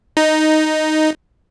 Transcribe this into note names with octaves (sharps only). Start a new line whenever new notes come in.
D#4